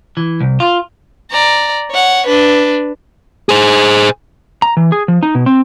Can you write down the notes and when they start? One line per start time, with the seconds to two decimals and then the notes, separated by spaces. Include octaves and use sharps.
0.17 E3
0.40 C2
0.60 F4
1.32 D5 A#5
1.91 C#5 F#5
2.27 D4 B4
3.49 G#4 C5
4.62 A#5
4.77 E3
4.92 G#4
5.08 F3
5.23 D#4
5.35 B2
5.46 C4